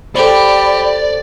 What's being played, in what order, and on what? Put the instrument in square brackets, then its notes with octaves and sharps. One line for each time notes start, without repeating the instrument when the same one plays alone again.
[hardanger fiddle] G4 [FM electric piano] A4 C5 [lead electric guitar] D5 [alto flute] B5